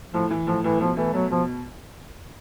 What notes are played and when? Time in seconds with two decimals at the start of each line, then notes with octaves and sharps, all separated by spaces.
0.13 A2 F3
0.30 E3
0.47 A2 F3
0.64 A2 E3
0.80 B2 F3
0.97 E3 A3
1.14 B2 F#3
1.30 B2 F3